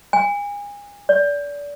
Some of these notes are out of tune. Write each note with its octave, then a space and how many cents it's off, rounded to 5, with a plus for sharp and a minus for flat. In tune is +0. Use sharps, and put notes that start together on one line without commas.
G#5 -30
D5 -30